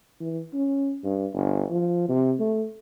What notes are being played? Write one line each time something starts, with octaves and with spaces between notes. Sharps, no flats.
E3
C#4
G2
G1
F3
C3
A3